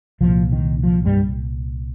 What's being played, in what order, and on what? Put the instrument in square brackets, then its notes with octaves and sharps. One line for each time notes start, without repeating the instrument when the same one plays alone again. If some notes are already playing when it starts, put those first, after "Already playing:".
[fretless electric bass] C2 A#2 F3
D#3
F3
G2 G3